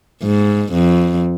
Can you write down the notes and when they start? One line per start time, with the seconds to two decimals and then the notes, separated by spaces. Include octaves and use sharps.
0.23 G#2
0.73 F2